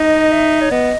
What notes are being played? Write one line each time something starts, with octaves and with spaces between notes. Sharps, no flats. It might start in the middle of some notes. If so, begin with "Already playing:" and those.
Already playing: D#4 D#5
E5
C#5
B3 D#5